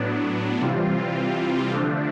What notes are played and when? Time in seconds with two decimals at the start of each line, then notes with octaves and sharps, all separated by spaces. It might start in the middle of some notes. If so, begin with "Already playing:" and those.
Already playing: A2 F#3 B3 D4
0.61 C3 E3 G3 C4 F4
1.71 D3 F3 A3 D4